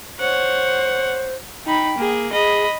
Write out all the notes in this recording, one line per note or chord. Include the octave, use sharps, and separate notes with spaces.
C5 C#5 F#5
D#4 G5 B5
A#3 G#4
G#4 D#5 B5